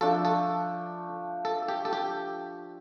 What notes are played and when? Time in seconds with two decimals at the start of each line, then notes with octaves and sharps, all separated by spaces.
0.01 F3 A3 D4 A4
0.25 A4
1.45 A4
1.68 G4
1.85 A4
1.93 G4